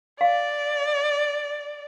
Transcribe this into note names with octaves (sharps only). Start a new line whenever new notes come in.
D5 F5